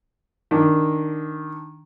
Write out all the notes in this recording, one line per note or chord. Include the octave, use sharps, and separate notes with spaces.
D#3 D4